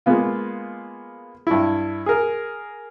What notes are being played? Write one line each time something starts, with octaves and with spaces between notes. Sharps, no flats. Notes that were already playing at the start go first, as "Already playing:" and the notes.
G#3 A#3 B3 F4
G2 E4
G#4 A#4